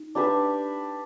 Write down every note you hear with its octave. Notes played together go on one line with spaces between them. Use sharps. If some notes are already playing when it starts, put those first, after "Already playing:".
Already playing: D#4
D4 G4 B4 E5